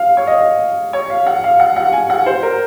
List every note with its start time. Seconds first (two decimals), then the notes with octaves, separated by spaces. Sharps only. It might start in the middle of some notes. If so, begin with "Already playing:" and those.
Already playing: F5
0.17 C#5
0.27 D#5
0.93 C#5
1.10 F5
1.26 F#5
1.44 F5
1.60 F#5
1.76 F#5
1.93 G#5
2.10 F#5
2.26 C5
2.43 A#4